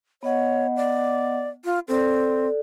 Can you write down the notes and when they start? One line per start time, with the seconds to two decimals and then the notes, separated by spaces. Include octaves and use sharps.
0.23 B3 C#5 D#5 F#5
0.76 D5
1.65 F4
1.88 C4 A4 D5